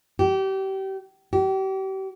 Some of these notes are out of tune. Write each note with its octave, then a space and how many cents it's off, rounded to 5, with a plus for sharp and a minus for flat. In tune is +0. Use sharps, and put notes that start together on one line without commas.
G4 -30
G4 -35